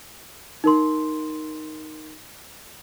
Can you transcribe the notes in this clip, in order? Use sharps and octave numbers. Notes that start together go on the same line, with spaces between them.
D#4 A#4 C6